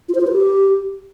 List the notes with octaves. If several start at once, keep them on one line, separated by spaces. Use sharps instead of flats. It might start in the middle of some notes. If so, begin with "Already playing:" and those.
F4
C5
F4
B4
G4